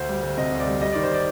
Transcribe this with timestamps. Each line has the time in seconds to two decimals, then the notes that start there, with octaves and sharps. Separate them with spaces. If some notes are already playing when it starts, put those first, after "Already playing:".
Already playing: D2 C5
0.09 G3
0.23 D2
0.37 C3 D#5
0.52 D2
0.60 D5
0.67 G3
0.81 G3 D#5
0.92 D#3 D5
1.03 C5
1.14 D5